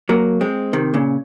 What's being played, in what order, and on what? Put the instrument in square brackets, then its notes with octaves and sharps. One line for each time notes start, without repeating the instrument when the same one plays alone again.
[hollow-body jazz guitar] F#3 A#3
G#3 C4
C3 D#3
A#2 C#3